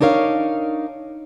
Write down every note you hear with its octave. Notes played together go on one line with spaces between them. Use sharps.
D4 D#4 A#4 C#5 F5